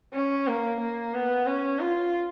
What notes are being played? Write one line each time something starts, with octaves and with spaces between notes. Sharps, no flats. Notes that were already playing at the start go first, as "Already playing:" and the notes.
C#4
A#3
A#3
B3
C#4
F4